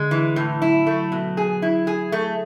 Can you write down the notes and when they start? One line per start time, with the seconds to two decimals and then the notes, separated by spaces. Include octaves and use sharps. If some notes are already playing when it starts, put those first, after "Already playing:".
Already playing: D3 G#3
0.11 E3
0.36 A2
0.62 F#3 E4
0.87 A3
1.12 B2
1.37 G#4
1.62 E4
1.87 G#4
2.12 A3